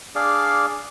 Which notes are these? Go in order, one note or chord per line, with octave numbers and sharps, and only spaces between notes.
D4 G#4 D5 F5